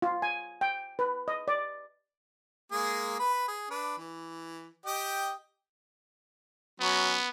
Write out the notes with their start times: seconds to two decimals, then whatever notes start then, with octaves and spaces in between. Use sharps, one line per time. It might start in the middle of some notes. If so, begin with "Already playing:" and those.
0.02 F4
0.22 G#5
0.61 G5
0.99 B4
1.28 D#5
1.48 D5
2.72 G#3 A#3 G#4
3.19 B4 B5
3.48 G#4
3.70 D4 B4
3.98 E3
4.86 G4 D#5 G5
6.80 F#3 B3 C#4